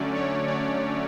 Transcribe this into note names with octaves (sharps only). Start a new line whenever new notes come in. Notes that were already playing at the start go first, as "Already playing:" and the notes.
Already playing: D3 F#3 A3 C#4 D5
C#5
D5